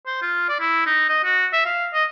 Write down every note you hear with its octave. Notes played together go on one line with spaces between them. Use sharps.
C5
F4
D5
E4
D#4
D#5
F#4
E5
F5
D#5